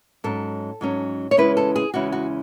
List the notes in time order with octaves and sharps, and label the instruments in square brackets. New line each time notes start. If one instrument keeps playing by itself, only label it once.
[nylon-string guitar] G#2 F#3 C#4 A4
G#2 F#3 C#4
C#5
E2 C#3 G#3 C#4 E4 B4
A4
G#4
E2 C#3 G#3 C#4 E4 F#4
F#4